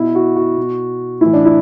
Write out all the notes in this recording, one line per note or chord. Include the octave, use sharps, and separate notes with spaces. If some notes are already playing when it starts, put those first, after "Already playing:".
Already playing: B2 E4
F#4
F#4
B2
A2 E3 E4
D4
E4